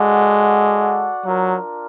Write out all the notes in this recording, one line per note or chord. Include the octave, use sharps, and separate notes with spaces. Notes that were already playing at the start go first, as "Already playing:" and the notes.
Already playing: G#3 F#4 A4 D5 F#5
F#3 D4 F4 A#4